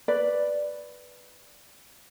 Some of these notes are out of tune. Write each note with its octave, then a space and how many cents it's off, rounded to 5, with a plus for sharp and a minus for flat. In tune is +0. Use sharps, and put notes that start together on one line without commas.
B4 +0 D5 +0